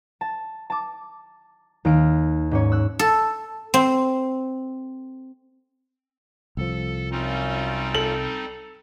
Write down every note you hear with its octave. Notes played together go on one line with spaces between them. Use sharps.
A5
A5 D6
D#2 F6 D7
G#2 C#4 C#5
E6 F#6
A4
C4
C2 F3 A4
F#2 G3 C4 C#4 D#4 F4
A4 F#7